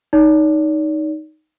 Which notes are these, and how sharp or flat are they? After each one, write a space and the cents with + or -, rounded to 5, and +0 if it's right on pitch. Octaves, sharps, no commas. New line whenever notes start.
D#4 +0 D5 -45